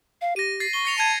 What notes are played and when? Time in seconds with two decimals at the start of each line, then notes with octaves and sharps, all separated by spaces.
0.21 F5
0.36 G4 A#6 D#7
0.60 A6 C7
0.73 C#6 G7
0.85 A#6 C#7 F7
0.98 A5 G#6 D#7